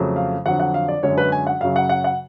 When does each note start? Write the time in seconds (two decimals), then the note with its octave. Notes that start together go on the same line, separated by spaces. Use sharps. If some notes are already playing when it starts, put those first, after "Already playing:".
Already playing: F2 C#3 F#3 A3
0.16 F5
0.46 F2 D3 F#3 F#5
0.60 F#5
0.74 F5
0.88 D5
1.03 F#2 D3 G#3 C#4 C#5
1.18 B4
1.32 G#5
1.47 F#5
1.61 F#2 C#3 F#3 F5
1.76 F#5
1.89 F#5
2.04 F#5